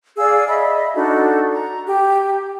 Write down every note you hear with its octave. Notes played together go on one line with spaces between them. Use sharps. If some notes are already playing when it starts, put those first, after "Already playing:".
G#4 D5 F5 E6
D#5 E5 B5
D4 D#4 F#4 A4
A#5
G4